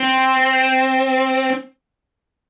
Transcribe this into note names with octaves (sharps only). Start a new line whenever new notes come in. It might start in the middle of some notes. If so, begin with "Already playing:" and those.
Already playing: C4